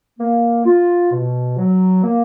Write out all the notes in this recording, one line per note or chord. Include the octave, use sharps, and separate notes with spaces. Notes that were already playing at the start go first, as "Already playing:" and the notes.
A#3
F4
B2
F#3
A#3